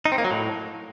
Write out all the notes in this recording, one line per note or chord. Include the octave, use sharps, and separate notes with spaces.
D#4
C4
A#3
F#3
A2